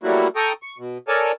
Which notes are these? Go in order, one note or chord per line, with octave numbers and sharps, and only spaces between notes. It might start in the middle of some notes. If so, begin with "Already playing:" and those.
F#3 G3 A3 A#3 E4 F#4
A4 G5 A#5 C#6 D#6
C#6
B2
A4 A#4 C#5 D5 G#5 A5